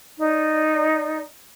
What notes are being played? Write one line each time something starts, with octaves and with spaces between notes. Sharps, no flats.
D#4 D5